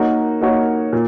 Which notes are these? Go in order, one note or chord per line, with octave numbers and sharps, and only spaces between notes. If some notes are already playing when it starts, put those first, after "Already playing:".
Already playing: A#3 D#4 F#4 A#4 C#5
A#3 D#4 F#4 A#4 C#5
A#2